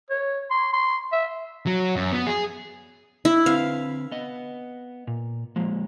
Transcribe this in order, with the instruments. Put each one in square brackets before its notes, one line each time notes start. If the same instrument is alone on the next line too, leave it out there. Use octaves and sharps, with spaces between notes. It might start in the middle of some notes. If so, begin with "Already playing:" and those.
[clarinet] C#5
C6
C6
E5
[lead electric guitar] F#3
F#2
B3
G#4
[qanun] E4
[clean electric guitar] D3 C4 B4 [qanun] F5
[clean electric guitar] B3 D#5
A#2
F3 G#3 A#3